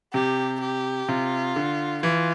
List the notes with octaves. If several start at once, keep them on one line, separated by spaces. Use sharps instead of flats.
C3 G4
G4
C3 F4
D3
E3 F4